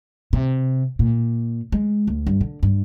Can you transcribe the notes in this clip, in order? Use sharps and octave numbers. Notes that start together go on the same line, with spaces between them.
C3
A#2
G#3
D2
G2
D3
G2